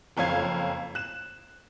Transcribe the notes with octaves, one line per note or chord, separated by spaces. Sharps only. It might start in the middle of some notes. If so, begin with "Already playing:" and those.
F#1 F2 C#5 F5 G#6 C7
F#6 E7